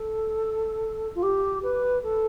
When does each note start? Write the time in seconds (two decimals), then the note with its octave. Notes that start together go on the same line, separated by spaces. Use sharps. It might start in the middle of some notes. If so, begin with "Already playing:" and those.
Already playing: A4
1.15 F4
1.22 G4
1.62 B4
2.03 A4